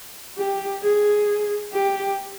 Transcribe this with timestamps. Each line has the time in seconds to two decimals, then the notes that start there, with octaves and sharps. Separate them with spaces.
0.37 G4
0.82 G#4
1.73 G4